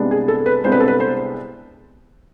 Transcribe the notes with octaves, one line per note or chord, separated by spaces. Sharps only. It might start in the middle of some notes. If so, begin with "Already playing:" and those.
Already playing: C2 C3 G#3 B3 D4
G#4
A4
B4
C2 C3 G#3 B3 D4 C5
B4
A4
B4
C5